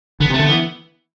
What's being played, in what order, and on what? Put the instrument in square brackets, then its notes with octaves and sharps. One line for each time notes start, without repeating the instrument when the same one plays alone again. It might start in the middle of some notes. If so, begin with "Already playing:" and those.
[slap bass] D3 [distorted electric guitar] B3
[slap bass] C3 [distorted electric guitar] A3
[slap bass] D3
[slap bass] E3 [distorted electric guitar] B3